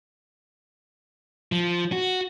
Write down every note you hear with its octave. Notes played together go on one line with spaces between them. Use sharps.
F3
F#4